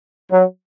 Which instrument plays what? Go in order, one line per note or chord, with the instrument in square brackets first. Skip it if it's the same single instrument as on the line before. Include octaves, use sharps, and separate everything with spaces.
[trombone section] F#3